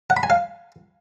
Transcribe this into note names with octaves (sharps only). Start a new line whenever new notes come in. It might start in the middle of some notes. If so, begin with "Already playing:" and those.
F#5
B5
G#5
F5